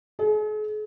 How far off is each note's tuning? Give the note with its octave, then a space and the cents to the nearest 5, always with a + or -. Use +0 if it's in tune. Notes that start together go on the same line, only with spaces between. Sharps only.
G#4 +45